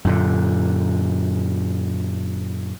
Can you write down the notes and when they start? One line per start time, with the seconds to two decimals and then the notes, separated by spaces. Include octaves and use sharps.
0.05 F#2 A#2 D3